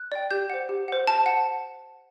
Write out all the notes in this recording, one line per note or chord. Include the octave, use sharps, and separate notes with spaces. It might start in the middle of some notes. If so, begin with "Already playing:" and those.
Already playing: F#6
D5 G5
G4 G6
C5 F#5
G4
C5 F#5
C5 A5
F#5